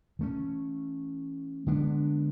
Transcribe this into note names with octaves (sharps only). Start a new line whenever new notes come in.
E3 A3 C#4
D3 G#3 B3 D4